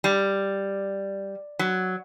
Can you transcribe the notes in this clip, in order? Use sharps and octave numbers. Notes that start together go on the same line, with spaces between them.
G3
F#3